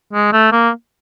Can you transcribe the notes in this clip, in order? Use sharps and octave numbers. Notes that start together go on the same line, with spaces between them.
G#3
A3
A#3